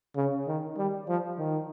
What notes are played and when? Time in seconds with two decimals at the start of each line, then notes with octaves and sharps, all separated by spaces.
0.16 C#3
0.47 D#3
0.77 G3
1.08 F3
1.39 D#3